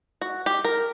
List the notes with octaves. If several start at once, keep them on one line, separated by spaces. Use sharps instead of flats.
F#4
G4
A#4